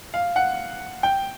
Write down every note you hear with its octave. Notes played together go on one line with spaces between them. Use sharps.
F5
F#5
G5